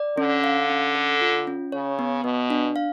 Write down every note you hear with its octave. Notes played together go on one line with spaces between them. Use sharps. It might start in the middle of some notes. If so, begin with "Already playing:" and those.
Already playing: D5
D3 C#4
F5
C#4
A4
F4
C#4
C#3 C#5
B3
B2 B3
D4
F5